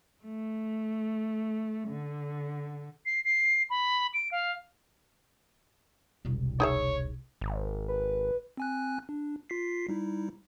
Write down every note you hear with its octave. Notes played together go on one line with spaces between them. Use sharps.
A3
D3
C7
C7
B5
D7
F5
E1 C2
D#4 G#4 C#5 E5
G#1
B4
C4 G#5 F#6
D4
F4 B6 C7
G3 D#4 E4